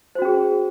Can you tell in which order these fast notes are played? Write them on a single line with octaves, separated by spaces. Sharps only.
C5 F#4 C#4 G#4